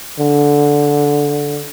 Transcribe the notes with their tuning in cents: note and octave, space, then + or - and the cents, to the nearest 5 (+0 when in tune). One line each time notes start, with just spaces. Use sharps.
D3 -10